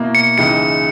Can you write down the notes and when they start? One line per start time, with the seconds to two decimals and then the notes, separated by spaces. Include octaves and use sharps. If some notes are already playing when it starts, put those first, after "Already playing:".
Already playing: B2 A#3 E4
0.15 C#7
0.38 C#2 C#3 E3 G#3 D#4 C#7